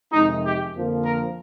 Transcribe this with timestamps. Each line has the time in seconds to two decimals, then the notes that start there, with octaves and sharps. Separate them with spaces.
0.12 F2 C3 D#3 G#3 D#4
0.44 G4
0.73 F2 D3 F3 A#3
1.03 A#4